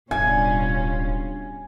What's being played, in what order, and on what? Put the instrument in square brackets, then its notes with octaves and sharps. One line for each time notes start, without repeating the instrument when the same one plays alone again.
[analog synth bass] D1 [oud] G2 [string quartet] B2 C#4 F4 [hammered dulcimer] G#5